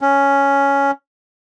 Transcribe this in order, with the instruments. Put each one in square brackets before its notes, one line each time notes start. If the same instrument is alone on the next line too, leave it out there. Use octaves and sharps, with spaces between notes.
[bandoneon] C#4